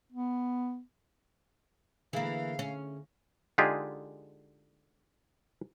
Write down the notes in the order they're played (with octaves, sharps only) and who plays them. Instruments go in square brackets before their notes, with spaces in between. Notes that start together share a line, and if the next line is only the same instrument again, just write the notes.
[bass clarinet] B3
[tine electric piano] D3 G#4 [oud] E3 A#3 [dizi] F5
[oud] C#4
[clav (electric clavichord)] D3 G#3 D#4 F4 G4 G#4